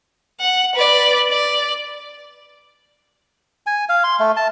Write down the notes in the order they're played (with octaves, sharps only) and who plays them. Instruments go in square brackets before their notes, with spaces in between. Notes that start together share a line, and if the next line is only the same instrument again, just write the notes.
[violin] F#5
B4 D5
D5
[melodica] G#5
F5
C6
A3
A5